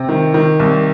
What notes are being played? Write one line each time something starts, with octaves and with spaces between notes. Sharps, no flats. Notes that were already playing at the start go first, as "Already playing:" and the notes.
Already playing: C3
D#3
D#3
C2